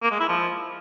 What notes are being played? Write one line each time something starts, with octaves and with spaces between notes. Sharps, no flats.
A#3
G#3
E4
F3